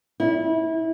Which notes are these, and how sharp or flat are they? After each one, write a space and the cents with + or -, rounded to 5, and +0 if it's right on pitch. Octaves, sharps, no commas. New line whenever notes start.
E4 -25